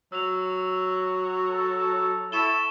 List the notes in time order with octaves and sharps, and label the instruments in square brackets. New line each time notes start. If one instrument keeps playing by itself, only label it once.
[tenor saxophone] F#3 [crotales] E6 F7
[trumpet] A4
[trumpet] E4 [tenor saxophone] A4 [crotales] C#6 E7 G7